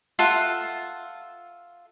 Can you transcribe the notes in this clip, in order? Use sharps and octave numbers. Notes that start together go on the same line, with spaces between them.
F4 A4 E5 F#5